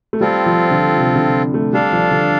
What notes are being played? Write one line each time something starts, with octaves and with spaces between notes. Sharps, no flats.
A3
G3 C4 F4 A4
F3
D3
C3
D3
A3
G3 D4 A4 F5
F3
D3